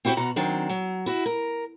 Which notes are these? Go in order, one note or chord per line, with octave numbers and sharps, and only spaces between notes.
C4 E4 F#4 G4 C5
B2 F#4 A#5
D#3 F#3 C4 D4
F#3
E4 F#4
A#4